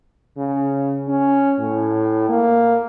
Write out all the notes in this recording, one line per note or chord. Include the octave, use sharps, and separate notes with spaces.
C#3
C#4
A2
A#3